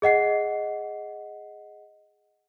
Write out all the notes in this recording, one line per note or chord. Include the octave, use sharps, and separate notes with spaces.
G#4 D#5 F#5 C7